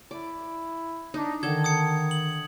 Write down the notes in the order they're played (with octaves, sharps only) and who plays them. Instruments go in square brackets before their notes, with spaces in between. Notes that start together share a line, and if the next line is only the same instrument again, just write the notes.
[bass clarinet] E4 [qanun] D5
[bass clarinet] D4 [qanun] D#4
[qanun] D3 A4 [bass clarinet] D#3 [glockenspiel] G#6
[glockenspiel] D#6 G#6 C#7
F#7